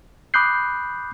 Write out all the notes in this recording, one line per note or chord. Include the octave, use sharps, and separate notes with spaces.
B5 D6 D#6 F#6 G6 C7